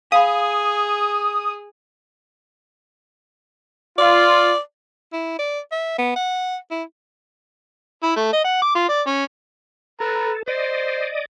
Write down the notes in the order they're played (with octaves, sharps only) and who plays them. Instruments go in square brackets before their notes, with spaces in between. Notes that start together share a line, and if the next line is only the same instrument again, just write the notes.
[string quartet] G#4 [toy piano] F5 B5 [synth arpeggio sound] D#6
[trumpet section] F4 [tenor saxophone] D5
[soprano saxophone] E4
D5
E5
B3
F#5
E4
[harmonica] E4
A3
D#5
F#5
D6
F4
D5
C#4
[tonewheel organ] A4 [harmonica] B4 A#5
[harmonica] C5 [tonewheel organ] D5 D#5